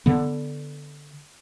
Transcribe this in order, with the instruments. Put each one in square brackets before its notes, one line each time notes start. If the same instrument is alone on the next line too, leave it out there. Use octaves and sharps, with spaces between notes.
[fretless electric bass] D3 B3